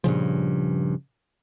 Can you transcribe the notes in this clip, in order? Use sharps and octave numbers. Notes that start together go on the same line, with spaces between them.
G2 A#2 C#3 F3